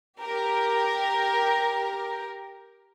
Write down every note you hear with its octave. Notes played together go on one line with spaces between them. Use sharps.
G4 A#4